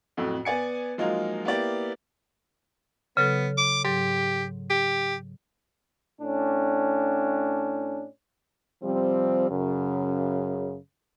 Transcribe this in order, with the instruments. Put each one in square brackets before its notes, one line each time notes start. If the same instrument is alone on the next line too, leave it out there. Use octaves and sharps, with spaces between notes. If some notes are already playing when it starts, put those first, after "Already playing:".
[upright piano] F2 A2 F#3
B3 D5 G#5 C#7
F3 F#3 G#3 A#3 D#4 F4
A#3 B3 E4 G4 D5
[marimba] C#3 F#3 A4 [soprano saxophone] B3
[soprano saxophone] D6
[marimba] G#2 F#3 [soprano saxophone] G4
[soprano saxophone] G4
[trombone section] A2 C#4 D4
[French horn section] C3 F3 G3 C4
F#2 C#3